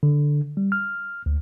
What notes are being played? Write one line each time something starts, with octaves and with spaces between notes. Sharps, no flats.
D3
G3
F6
D2